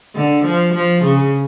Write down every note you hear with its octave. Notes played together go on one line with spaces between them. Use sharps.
D3
F3
F3
C#3